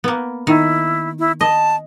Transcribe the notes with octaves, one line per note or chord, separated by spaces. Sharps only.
A#3 B3
D#3 E4
E4
D#5 A5